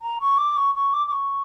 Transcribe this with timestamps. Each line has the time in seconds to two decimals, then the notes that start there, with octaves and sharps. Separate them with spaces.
0.02 A#5
0.20 C#6
0.38 D6
0.57 C#6
0.75 C#6
0.93 D6
1.07 D6
1.11 C#6